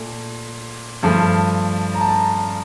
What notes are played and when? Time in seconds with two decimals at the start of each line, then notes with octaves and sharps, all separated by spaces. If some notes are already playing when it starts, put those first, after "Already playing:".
Already playing: A#2 A3
1.03 G2 F3 A3
1.94 A#5
2.01 A5
2.09 A#5